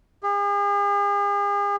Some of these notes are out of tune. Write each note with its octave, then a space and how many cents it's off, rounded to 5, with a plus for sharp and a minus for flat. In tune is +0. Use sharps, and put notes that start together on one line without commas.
G#4 -45